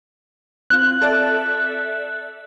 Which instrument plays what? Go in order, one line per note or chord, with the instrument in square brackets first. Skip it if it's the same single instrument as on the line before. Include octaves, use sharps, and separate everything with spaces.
[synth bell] C4 F4 [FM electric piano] F#6
[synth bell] A4 D5 E5